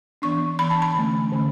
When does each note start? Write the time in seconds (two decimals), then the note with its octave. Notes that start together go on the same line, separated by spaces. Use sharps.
0.22 E3 B3 D4 C#6
0.59 E3 B3 D4 B5
0.70 A5
0.82 B5
0.95 D3 A3 C#4
1.32 D3 A3 C#4